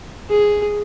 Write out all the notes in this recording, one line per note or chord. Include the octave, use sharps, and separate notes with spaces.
G#4